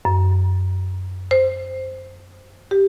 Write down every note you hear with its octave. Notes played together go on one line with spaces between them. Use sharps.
F#2
C5
G4